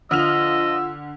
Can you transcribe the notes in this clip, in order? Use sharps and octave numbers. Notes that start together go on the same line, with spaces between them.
D3 F3 F4 D#5 E6 F6 F7